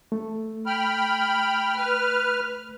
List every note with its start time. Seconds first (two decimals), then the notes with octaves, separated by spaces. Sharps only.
0.12 A3
0.66 G5 B5 F6
1.76 B4 F6